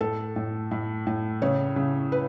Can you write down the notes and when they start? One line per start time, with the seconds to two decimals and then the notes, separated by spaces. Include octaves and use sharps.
0.01 A2 A4
0.36 A2
0.71 A2
1.07 A2
1.42 C#3 C#5
1.76 C#3
2.12 B4